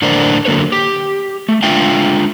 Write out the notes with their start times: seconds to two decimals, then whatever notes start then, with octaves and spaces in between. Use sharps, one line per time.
0.02 A2 D3 D4 A#4 C5 D5
0.45 D3 F#3 A#3 B4 C#5
0.72 G4
1.49 A3
1.63 G#3 D4 F4 E5 F5 G5